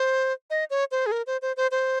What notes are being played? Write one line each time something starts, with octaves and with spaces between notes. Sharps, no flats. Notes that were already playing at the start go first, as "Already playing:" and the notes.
Already playing: C5
D#5
C#5
C5
G#4
A#4
C5
C5
C5
C5